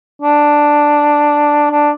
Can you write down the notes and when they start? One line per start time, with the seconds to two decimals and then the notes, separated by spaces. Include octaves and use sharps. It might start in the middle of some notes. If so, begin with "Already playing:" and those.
0.22 D4
1.71 D4